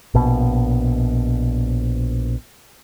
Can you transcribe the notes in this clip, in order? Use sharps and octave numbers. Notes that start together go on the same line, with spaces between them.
A#1 B2